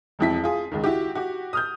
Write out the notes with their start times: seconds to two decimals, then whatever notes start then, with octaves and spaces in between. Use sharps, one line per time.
0.19 E1 F2 E4 B6
0.44 F4 G#4
0.72 C#2 D#3
0.84 E4 F#4 G4
1.15 F#4 G4
1.53 D#6 F6 G6